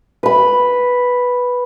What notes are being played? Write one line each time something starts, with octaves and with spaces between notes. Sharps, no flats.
B4 B5